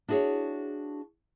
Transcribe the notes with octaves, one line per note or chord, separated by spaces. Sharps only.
D4 E4 F#4 G#4 C#5